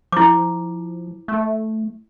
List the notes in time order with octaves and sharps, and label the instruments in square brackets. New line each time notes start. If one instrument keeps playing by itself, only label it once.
[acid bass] F3 [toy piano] E4 D6
[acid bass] A3